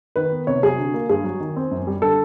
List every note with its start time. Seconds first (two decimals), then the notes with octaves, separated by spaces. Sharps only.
0.16 D#3 B4
0.32 B3
0.47 C3 C#5
0.63 F#3 G#4
0.78 D3
0.94 A#3
1.09 G2 G#4
1.25 F#3
1.40 D#3
1.56 C4
1.71 F#2
1.87 G3
2.02 D3 A4